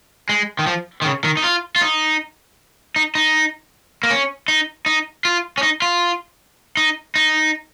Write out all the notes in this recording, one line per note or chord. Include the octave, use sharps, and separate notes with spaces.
G#3
D#3
F3
D#3
C#3
D#3
D#4
F4
F4
D#4
D#4
D#4
A#3
C#4
D#4
D#4
F4
C#4
D#4
F4
D#4
D#4